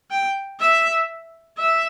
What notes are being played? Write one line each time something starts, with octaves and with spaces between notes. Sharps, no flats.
G5
E5
E5